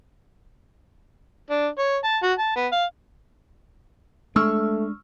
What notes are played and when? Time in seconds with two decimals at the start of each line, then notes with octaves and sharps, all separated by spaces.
1.50 D4
1.79 C#5
2.04 A5
2.23 F#4
2.39 A5
2.56 B3
2.72 F5
4.36 G#3 A3 D4 C#6 E6 F6